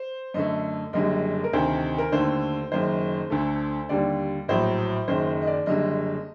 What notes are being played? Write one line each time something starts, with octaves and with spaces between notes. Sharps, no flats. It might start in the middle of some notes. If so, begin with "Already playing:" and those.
Already playing: C5
F#2 D3 A3 D#5
F#1 F#2 D3 G3 D#5
A#4
D2 C3 D#3 C5
A#4
D#2 D3 A3 C5
F#1 F#2 D#3 C5
D2 D3 A3
D#2 D3 G3 D5
A#1 A2 F#3 C5
F#1 F#2 D#3 C5
D#5
D5
F#1 F#2 D3 G3 D#5